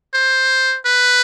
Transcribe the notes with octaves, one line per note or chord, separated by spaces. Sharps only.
C5
B4